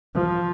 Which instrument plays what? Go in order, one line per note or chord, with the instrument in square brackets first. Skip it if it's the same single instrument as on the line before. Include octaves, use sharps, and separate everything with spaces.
[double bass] F3